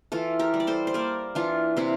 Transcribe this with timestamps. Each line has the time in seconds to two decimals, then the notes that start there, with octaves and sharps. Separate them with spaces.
0.12 E3 F4 A4
0.39 G4 A#4
0.54 G3
0.60 D5
0.67 A4 C5
0.87 C5
0.94 A#3 A#4 D5
1.35 E3 D4 F4
1.77 C3 C4 E4